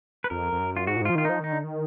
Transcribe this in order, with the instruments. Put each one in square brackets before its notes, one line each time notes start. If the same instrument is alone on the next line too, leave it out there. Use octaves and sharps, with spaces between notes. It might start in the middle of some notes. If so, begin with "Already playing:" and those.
[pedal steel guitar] B4
[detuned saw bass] F2 [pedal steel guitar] A#4
[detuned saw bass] F2
F#2
[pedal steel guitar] F4
[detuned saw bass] G#2 [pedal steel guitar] F#4
[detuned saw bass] A#2
[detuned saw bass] G#2 [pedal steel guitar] F4
[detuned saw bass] F3
[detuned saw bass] D#3 [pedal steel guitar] F4
[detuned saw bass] F3 [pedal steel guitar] D#4
[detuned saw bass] D#3 [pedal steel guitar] D#4
[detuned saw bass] D3
D#3